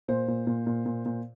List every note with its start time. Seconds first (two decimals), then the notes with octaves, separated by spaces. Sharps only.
0.08 A#2 C5
0.28 A#2
0.47 A#2
0.66 A#2
0.86 A#2
1.05 A#2